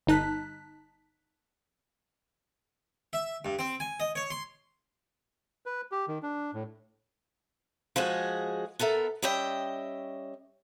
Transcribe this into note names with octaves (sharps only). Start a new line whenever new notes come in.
G1 D#4 A5 F#6 B6
E5
G2
C4
G#5
D#5
C#5
C6
B4
G4
D#3
D4
A2
F3 G#3 F#4 G#4
B3 A4 A#4 E5
G3 C#4 D#5 E5 G5